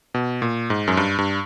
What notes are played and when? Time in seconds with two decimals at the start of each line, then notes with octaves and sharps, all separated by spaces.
0.14 B2
0.42 A#2
0.70 G#2
0.88 F#2
0.97 G2
1.18 G2